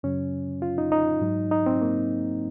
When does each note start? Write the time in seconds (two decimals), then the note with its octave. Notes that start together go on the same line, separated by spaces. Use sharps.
0.03 F#2 C#3 F#3 C#4
0.62 F4
0.78 D#4
0.92 D#4
1.21 G#2 F#3
1.51 D#4
1.66 C4
1.81 A#3